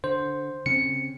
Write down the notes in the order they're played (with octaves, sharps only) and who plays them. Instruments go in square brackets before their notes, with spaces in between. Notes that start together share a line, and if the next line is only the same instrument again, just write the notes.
[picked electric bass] D3 [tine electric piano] C5
[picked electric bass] C#3 C4 C#4 [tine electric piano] C#7